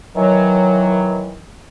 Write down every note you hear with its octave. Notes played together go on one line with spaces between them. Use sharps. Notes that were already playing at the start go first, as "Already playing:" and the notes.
D#3 E3 F#3